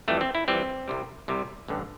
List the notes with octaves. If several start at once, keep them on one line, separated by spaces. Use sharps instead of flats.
F2 E3 G3 A3
C4
E4
F2 E3 G3 C4
C2 C3 G3
C2 C3 G3
A1 G2 D3